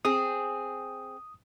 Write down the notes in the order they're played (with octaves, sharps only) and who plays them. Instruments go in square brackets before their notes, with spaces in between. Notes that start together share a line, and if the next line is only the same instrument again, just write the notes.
[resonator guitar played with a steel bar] C4 G#4 [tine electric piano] D#6